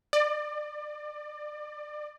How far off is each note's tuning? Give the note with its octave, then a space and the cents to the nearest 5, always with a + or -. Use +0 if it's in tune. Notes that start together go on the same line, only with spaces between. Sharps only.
D5 +30